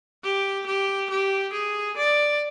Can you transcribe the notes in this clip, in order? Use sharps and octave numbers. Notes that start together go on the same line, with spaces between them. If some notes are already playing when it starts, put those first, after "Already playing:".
G4
G4
G4
G#4
D5